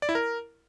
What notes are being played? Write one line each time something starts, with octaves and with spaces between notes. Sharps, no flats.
D5
E4
A#4